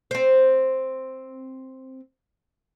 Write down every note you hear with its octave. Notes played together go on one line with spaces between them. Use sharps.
C4 C5